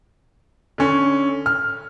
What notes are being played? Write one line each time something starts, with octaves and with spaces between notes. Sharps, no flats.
D3 C#4
F6